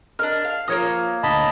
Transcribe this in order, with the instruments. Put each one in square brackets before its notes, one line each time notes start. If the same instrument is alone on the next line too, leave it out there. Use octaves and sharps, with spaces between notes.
[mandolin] D4 F6 [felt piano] A#4 D#5
[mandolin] F5
[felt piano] F3 A#4 A#6 [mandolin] A#3 C#5 D#6
[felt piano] D2 [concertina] D#5 A5 B5